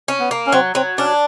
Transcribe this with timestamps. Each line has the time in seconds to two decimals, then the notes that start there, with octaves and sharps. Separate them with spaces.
0.08 C#4
0.20 B3
0.31 A#3
0.47 C#4
0.52 F#3 C4
0.75 F#3 C4
0.98 C#4 D4